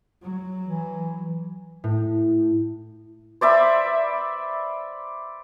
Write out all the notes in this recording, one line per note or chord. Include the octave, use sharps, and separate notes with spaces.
F#3
E3
A2
C5 D5 E5 B5